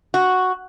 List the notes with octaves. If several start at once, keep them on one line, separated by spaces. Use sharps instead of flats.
F#4